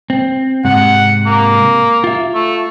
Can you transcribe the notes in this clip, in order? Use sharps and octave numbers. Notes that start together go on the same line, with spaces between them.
C4
G#2 C3 F#5
A#3
F4 E5
A3